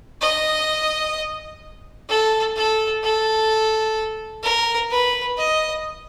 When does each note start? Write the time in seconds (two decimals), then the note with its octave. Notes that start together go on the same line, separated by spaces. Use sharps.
0.21 D#5
2.09 A4
2.56 A4
3.03 A4
4.43 A#4
4.90 B4
5.37 D#5